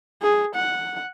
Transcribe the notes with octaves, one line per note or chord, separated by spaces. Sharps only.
G#4
F#5